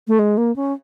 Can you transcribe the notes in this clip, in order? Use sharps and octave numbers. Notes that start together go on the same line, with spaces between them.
A3
G#3
A#3
C#4